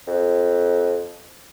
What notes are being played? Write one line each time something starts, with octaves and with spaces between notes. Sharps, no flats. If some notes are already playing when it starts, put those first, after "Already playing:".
F2